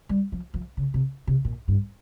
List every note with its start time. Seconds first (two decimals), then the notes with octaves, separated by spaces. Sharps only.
0.09 G3
0.32 F3
0.54 F3
0.77 C#3
0.94 C3
1.27 C3
1.45 A#2
1.68 G2